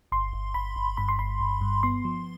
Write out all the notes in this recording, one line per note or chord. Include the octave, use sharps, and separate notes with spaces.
G1 C6
G1
G1 B5
G1
G2 B5
C6
G1 B5
G1
G2
B3 C6
F3